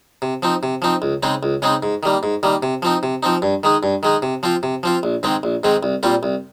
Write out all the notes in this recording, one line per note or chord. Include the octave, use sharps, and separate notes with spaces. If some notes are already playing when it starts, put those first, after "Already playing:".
C3
F3 C4 D#4
C3
F3 C4 D#4
C#2
C#3 G#3 C4 D#4
C#2
C#3 G#3 C4 D#4
G#2
D#3 G3 A#3
G#2
D#3 G3 A#3
C3
F3 C4 D#4
C3
F3 C4 D#4
G2
D#3 G#3 D#4
G2
D#3 G#3 D#4
C3
F3 C4 F4
C3
F3 C4 F4
A#1
G#2 D#3 G#3 C4
A#1
G#2 D#3 G#3 C4
C2
A#2 G3 C4 F4
C2